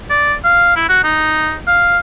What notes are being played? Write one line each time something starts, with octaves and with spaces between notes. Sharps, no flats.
D5
F5
E4
F#4
D#4
F5